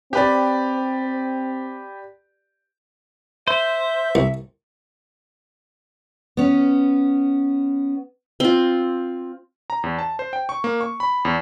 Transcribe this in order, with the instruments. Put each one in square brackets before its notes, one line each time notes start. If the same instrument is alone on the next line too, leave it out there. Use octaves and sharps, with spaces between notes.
[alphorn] C4 [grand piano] G4 B4 D5
[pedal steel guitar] C5 [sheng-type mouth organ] E5
[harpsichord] C2
[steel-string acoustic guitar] B3 C#4
[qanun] C4 F4
[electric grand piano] A#5
E2
A5
C5
G5
C#6
A#3
C#6
B5
E2